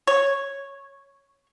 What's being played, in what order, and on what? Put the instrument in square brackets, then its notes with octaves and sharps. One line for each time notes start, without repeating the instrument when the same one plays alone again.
[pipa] C#5